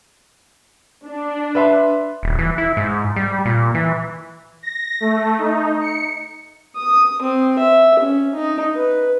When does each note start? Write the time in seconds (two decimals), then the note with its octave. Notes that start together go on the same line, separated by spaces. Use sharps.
1.06 D4
1.55 B4 E5 C6
2.23 D#1
2.38 E3
2.58 E4
2.77 G#2
3.16 G3
3.45 A#2
3.75 E3
4.62 A#6
5.00 A3
5.38 D#4
5.81 C#7
6.77 D#6
7.22 C4
7.59 E5
7.99 C#4
8.35 D#4
8.76 B4